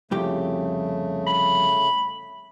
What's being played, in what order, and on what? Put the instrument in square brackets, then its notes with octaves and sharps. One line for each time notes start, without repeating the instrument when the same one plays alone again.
[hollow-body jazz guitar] C2 F2 G4 [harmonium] C#3 A3
[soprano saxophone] B5